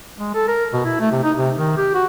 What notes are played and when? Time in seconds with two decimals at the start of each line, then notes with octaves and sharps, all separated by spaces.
0.18 G#3
0.34 A4
0.48 A#4
0.73 B2
0.85 E4
1.00 A3
1.12 C3
1.23 D#4
1.37 C3
1.56 D#3
1.77 G4
1.95 F#4